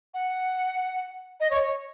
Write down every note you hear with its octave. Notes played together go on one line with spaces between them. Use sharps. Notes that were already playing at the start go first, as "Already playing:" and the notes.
F#5
D#5
C#5